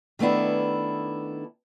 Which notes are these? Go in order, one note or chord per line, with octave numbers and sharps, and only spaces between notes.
D#3 A3 B3 D4 E4